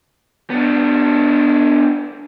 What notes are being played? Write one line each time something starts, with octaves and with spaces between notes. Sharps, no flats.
B3 D4